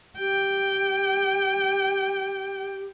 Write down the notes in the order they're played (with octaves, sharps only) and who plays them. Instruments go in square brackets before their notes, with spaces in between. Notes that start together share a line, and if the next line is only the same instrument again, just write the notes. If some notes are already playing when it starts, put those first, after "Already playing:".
[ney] G4 [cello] G5